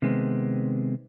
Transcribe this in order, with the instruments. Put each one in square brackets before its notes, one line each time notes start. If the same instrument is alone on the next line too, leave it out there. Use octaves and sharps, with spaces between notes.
[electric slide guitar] C3 D#3 G#3 B3 C4